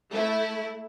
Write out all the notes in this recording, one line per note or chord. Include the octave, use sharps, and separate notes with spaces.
A3 E4